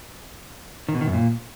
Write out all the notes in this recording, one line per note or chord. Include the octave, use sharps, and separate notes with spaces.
D#3
B2
D#3
F#2
A#2